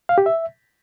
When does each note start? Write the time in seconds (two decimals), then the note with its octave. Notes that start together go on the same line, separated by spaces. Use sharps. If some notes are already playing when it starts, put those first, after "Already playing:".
0.09 F5
0.18 G4
0.26 E5